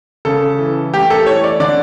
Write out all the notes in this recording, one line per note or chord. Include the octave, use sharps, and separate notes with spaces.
C#3 A4
E3
A3 G4
A4
E3 C#5
D5
D3 D5